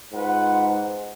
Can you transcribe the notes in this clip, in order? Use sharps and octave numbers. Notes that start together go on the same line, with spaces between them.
G#2 F4 B4 F#5